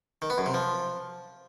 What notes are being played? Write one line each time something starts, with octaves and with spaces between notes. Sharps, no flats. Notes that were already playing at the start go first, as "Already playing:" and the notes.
D#3
B3
F#2
C3
F3